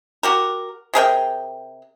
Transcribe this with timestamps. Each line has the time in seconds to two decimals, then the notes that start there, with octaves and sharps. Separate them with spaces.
0.23 F#4 G4 A#4
0.94 C3 G#4 A#4 G5